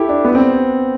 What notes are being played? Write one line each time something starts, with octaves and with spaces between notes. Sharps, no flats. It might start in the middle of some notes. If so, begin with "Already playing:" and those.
Already playing: E4 G4 A4
D4
B3
C4